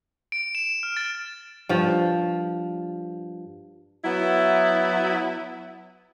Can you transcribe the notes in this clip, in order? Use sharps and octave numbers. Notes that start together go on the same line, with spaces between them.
D7
E7
F6
A6
G2 F3
F#3 B3 E4